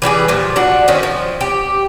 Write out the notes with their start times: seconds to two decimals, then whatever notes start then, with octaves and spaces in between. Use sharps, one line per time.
0.02 E3 G3 G4 G#4
0.28 A#2 F3
0.56 D4 F#4
0.88 D#3 C4 C#4
1.03 F3
1.41 G4